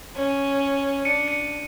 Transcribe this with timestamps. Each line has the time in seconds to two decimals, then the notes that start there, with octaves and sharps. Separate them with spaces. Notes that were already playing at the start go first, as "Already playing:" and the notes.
0.15 C#4
1.05 D4 C#7 D#7
1.28 C#7 D#7